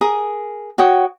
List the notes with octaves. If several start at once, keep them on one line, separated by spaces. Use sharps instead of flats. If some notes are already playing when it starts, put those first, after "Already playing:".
G#4 A#4 D#6
F#4 C#5 G5 D#6